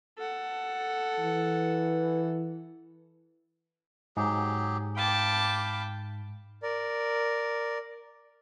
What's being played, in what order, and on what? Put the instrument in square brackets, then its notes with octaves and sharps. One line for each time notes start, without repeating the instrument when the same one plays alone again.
[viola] A4 F#5
[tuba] E3
[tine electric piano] G#2 [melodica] F#3 G4 G#4
[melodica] F5 B5 [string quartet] G5 A5 D6
[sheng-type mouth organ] A#4 D5